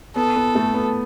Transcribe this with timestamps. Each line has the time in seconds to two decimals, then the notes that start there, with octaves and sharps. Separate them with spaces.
0.16 B3 A4
0.36 B3
0.55 A3
0.74 B3